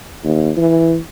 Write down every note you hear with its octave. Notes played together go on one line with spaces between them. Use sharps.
D#2
E3